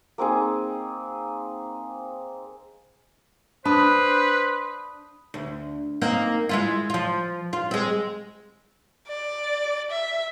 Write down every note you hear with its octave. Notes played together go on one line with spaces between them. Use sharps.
A#3 C4 D#4 G#4
D4 B4 C5 A5 B5 D#6
D2
A#3 C4 D#4
G#3 E4 F4
F3 F4
F4
G#3 C4
D5
E5